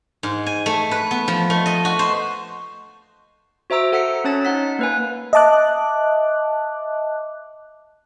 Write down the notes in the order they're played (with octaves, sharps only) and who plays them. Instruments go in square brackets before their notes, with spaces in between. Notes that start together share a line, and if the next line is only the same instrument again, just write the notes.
[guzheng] G#2
G#5
A3
B4
B3
F3
A3
D#5
F#4
C5
[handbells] F#4 C5 E5 A#5 E6 D7
A4 F#5 E6 B6 C#7
C#4 C#5 A5 A6
D#4 F#5 B6
A#3 B4 G#5
[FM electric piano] D#5 E5 A5 D6 F#6